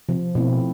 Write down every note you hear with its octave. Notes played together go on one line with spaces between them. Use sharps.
C3 F3
B2 A3 C4 E4